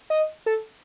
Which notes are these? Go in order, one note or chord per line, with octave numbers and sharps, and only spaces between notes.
D#5
A4